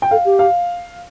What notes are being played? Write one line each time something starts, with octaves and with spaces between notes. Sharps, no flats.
G5
A4 F5
G4
F5